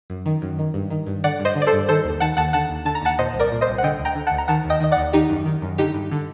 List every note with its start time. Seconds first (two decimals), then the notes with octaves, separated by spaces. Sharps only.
0.10 F#2
0.26 D#3
0.42 F#2
0.59 D#3
0.74 G2
0.90 D#3
1.07 G2
1.24 D3 D5 F#5
1.40 G2
1.45 C5 D#5
1.55 D3
1.62 D5
1.67 A4 C5
1.73 G2
1.89 D#3 A4 C5
2.04 D#2
2.20 D#3 F#5 A5
2.37 D#2 F#5 A5
2.53 D3 F#5 A5
2.69 D#2
2.85 D3 A5
2.95 A#5
3.02 D#2 F#5 A5
3.18 A#2 C5 D#5
3.34 C2
3.39 A#4 D5
3.51 A#2
3.61 C5 D#5
3.68 C2
3.78 F#5
3.83 D3 D#5 G5
3.99 D2
4.05 G5 A#5
4.15 D3
4.27 F#5 A5
4.31 D2
4.38 A#5
4.48 D#3 F#5 A5
4.65 D#2 D#5 G5
4.80 D#3 D#5
4.92 D5 F#5
4.97 D#2
5.13 D#3 D#4 G4
5.30 F#2
5.46 D#3
5.62 F#2
5.78 D3 D#4 G4
5.94 G2
6.11 D3